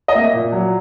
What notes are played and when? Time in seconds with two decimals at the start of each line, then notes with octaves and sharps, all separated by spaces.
0.08 D#5
0.14 A#3 E5
0.34 A#2
0.52 F#3